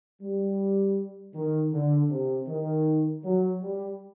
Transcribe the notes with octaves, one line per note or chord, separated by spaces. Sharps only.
G3
D#3
D3
C3
D#3
F#3
G3